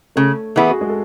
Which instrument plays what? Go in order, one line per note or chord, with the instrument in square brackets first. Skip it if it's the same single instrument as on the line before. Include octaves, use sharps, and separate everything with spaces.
[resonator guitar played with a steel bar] C#3 [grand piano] A3 A4
[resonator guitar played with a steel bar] E3 B3 E4 [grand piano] G#4
[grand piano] F#4
G#3 G#4
A4